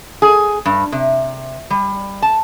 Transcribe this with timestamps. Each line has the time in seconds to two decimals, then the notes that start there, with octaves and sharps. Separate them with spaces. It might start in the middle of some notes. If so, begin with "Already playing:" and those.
0.22 G#4
0.66 G2
0.92 C3
1.70 G3
2.22 A5